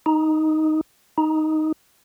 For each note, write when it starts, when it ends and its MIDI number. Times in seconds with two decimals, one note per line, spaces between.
0.06 0.81 63
1.18 1.72 63